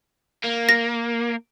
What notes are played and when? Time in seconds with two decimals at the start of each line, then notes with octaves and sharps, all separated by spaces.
0.44 A#3
0.69 A#6